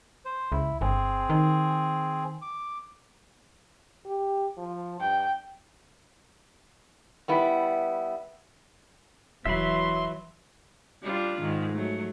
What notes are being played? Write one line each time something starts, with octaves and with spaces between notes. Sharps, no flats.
C5
C#2 E4
G1 C4 G#4
D#3
D6
G4
F3
G2 G5
G3 B3 E4
E1 E3 F#3 E5 B5 C6
G3 D4 F4
G#2 D#3
F#3 A3